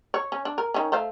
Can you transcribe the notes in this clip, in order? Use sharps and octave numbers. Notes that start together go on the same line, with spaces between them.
C#5
C#4
D4
A#4
D#3 C#4
A3 C5 F5